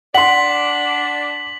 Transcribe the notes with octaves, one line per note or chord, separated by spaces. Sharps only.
D4 D5 F#5 C6 B6 F#7